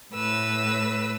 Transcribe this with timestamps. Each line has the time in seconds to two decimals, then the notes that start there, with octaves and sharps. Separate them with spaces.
0.14 A2 B4 E6